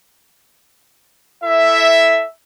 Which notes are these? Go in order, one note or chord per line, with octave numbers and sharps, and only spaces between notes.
E4 A4 E5